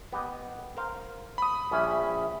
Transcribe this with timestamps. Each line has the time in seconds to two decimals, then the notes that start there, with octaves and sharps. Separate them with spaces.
0.12 B3 G4 D#5
0.77 A#4 C5 F5
1.38 B5 D#6
1.71 A#1 G3 C#4 E5